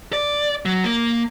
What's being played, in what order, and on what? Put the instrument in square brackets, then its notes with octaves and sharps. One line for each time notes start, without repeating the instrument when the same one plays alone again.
[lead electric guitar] D5
F#3
A#3